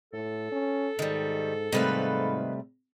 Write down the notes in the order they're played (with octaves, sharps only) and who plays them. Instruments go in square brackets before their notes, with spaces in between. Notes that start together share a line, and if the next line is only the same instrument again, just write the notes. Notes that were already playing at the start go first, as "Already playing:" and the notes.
[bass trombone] A2 [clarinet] A4
[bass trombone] C#4
[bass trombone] G#2 [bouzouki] D#3 G3
[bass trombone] G#2 [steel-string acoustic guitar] C3 G3 A3 [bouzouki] D#3 B4 F5